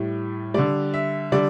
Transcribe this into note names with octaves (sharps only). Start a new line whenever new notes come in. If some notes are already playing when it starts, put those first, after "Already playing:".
Already playing: A2 G3
D3 G3 D5
E5
D3 G3 D5